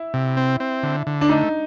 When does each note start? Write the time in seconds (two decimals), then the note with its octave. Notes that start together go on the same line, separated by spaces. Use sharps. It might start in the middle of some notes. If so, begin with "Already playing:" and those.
Already playing: E4
0.14 C3
0.37 C4
0.60 C4
0.83 D3
1.07 D3
1.21 D4
1.29 A3 D#4